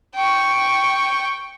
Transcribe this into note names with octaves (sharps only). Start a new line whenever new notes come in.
G5 C#6